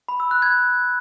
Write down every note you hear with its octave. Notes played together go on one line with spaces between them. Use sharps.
B5
E6
F#6
G#6